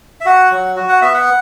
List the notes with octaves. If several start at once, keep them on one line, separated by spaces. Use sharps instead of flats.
E5
F#4 F#5
F#3
F#4
F#5
B3 E5
F#5